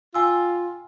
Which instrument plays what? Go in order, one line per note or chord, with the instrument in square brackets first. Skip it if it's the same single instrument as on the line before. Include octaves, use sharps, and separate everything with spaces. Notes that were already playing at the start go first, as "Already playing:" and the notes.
[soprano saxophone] F4 [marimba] G5 G#5 E6